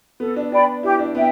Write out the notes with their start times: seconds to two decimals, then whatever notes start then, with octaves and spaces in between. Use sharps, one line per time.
0.20 B3 A4
0.36 D4
0.51 D4 D5 G5 B5
0.83 E4 G4
0.99 D4
1.15 B3 E5 G5